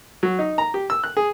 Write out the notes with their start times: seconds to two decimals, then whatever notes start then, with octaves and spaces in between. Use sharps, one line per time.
0.23 F#3
0.39 D#4
0.58 A#5
0.74 G4
0.90 E6
1.04 F#6
1.17 G#4